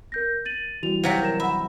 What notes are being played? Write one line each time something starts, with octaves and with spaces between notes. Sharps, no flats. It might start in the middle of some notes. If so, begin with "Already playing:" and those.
A#4 G6 A#6
A6 D#7 F#7
E3 G3 F#4 F7
C3 F#3 G4 F5 G5 B6
A#4 A#6 E7
E5 F#5 B5